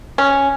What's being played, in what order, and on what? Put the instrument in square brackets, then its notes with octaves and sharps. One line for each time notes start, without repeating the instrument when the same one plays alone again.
[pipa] C#4